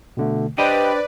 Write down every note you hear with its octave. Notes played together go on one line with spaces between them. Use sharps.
B2 D3 A3
D4 G4 B4 C5 D5 D#5 G5